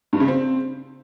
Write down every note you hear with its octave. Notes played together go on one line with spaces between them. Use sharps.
G2
C#3
C4